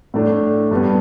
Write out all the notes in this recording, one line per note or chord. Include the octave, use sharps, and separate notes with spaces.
A2 A3 D4
G2 G3 B3